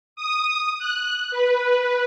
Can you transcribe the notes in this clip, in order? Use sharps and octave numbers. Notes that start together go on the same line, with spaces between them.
D#6
F#6
B4